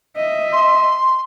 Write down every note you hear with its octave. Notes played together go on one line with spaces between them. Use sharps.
D#5 E5
C6